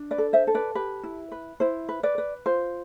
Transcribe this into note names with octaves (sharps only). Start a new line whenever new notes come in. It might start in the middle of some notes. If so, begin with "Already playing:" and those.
Already playing: D4
B4 D5
A4
C5 E5
A4
B4 D5
G4 B4
E4
B4
E4 C5
B4
B4 D5
B4
F4 C5